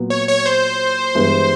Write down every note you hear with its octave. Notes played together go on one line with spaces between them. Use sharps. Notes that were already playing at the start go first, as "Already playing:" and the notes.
Already playing: A#2 F#3 B3
C#5
C#5
C5
G2 E3 G#3 B3